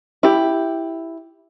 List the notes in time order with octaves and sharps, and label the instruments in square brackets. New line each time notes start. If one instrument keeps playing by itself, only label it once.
[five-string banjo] E4 G4